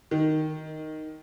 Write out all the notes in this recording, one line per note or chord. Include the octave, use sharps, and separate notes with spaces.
D#3